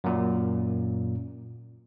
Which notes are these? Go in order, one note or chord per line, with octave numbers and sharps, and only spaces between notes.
F#2 A#2